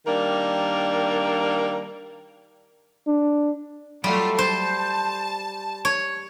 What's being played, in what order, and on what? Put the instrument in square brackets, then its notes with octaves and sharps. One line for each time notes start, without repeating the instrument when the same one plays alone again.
[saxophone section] D#3 G3 A#3 D4 A#4
[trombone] D4
[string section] F#3 A3 F4 [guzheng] G3
[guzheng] C5 [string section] A5
[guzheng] C#5